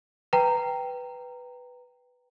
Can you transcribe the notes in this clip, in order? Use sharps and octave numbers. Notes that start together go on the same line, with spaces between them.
B4 G5 A#5